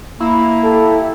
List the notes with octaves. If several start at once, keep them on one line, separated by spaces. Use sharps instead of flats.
A#3 E4
G4 A4